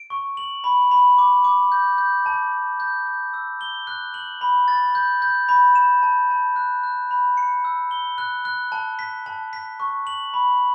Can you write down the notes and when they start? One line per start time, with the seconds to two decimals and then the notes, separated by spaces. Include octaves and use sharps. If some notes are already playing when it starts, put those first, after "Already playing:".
Already playing: D7
0.10 C#6
0.37 F#7
0.64 B5
0.91 B5
1.18 D6
1.44 D6
1.72 G6
1.98 G6
2.26 A5
2.52 A5
2.80 G6
3.07 G6
3.34 E6
3.61 G7
3.87 F#6
4.14 F#7
4.41 B5
4.68 A6
4.95 G6
5.22 G6
5.49 B5
5.75 E7
6.03 A5
6.30 A5
6.56 F#6
6.83 F#6
7.11 B5
7.37 C#7
7.65 E6
7.91 G7
8.18 F#6
8.45 F#6
8.72 A5
8.99 B6
9.26 A5
9.53 B6
9.80 C#6
10.07 F#7
10.34 B5